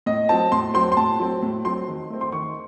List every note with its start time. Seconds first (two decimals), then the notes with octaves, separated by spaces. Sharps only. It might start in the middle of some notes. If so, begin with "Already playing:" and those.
0.06 A2 D#5
0.29 F#3 C4 A5
0.52 A2 C6
0.74 F#3 C4 C6
0.92 C6
0.97 A2 A5
1.19 F#3 C4
1.42 A2
1.65 F#3 C4 C6
1.88 D#3
2.10 A3 C4
2.21 C6
2.32 D#3 C#6